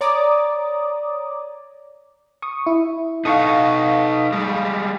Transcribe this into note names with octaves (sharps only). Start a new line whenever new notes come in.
C#5 D5 A#5 D6 D#6
C#6 D#6
E4
D#4 A4 F5 C#6 D#6
G3 G#3